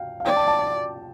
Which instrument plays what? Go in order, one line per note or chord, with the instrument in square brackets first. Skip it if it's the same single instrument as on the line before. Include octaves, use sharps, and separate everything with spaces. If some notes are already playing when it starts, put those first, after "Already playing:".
Already playing: [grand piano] F5 G5
F5
[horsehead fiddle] D5 [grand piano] G5
[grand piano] A5
A5
A5